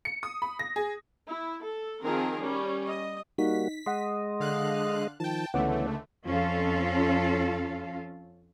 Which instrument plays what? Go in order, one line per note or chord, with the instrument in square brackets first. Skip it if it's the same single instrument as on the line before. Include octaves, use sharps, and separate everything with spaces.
[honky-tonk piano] C#7
D#6
B5
A#6
G#4
[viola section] E4
A4
D#3 F3 C4 G#4 A#4
G3 C#4
D#5
[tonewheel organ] G3 A#3 F#4 [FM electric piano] D#4 [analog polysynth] B6
[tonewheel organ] G#3 D#5 [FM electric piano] F#5 C6
[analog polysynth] D3 F5 F#6
[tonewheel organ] D#3 F3 [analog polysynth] G5 A5
[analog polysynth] C#2 D3 A3 [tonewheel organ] E3 B3 C#4 [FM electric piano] F#5 D6
[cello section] F2 C#4 F4 A4 F5